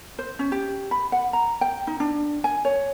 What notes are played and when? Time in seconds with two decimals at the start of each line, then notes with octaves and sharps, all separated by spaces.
0.19 C5
0.39 C#4
0.52 G4
0.91 B5
1.12 F#5
1.33 A#5
1.61 G5
1.87 D#4
2.00 D4
2.44 G#5
2.65 C#5